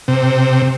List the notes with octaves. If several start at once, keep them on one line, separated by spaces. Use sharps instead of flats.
C3